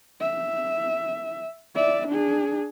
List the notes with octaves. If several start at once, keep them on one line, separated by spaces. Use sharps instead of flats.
E5
D5 E5
D4 G#4